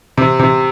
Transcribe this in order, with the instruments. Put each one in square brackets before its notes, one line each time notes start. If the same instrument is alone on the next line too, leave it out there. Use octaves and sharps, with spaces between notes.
[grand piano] C3
C3